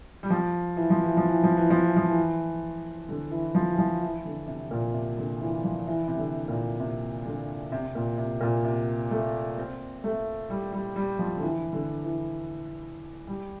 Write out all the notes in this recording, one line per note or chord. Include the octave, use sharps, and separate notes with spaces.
G3
F3
E3
F3
E3
F3
E3
F3
E3
F3
E3
F3
E3
D3
E3
F3
E3
F3
E3
D3
C3
A#2
C3
D3
E3
F3
E3
C3
D3
A#2
C3
D3
C3
A#2
C3
A#2
C3
A3
C4
A3
G3
G3
G3
F3
D3
E3
D3
E3
G3